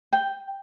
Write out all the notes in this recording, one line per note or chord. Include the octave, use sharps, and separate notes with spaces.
G5